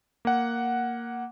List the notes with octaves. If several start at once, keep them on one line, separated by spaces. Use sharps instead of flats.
A#3 F#5